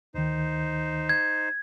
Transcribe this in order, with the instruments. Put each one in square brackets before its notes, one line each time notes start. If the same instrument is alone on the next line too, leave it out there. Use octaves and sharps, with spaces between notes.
[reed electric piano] D2 D#3 [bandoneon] D#4 C5
[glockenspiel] G#6